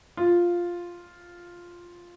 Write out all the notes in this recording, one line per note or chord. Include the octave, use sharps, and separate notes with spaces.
F4